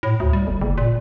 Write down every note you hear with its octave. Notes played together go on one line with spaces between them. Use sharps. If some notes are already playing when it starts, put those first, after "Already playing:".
A2
D2
G3
G1
F#1
A#2